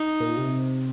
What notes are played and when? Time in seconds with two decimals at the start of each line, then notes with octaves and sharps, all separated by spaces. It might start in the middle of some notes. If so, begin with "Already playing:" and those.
Already playing: D#4
0.20 A#2
0.37 C3